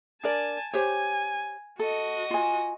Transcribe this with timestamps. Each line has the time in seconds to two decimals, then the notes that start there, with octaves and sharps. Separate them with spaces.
0.23 D4 A#4 D5 G#5 A5
0.73 G4 C5 C#5 G#5
1.79 F#4 A4 D#5
2.31 F4 G#5